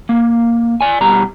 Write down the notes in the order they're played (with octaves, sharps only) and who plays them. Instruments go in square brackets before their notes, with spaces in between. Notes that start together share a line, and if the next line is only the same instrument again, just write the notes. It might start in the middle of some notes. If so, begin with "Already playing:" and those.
[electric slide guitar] A#3
D5 G#5
B2 G3 A#5